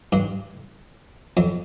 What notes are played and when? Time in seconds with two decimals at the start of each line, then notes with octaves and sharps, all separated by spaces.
0.12 G2
1.37 F2